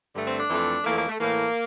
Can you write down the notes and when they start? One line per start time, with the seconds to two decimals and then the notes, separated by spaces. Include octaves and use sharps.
0.15 G2 D3 A3
0.26 C4
0.38 D4
0.50 F2 E3 A3
0.84 F2 E3 A3 A#3
0.96 A#3
1.08 A3
1.19 A2 E3 A3 A#3